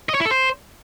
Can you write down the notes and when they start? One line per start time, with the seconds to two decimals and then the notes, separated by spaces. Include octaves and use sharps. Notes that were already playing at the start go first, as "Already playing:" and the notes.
0.09 D#5
0.15 C#5
0.20 E4
0.25 A4
0.31 C5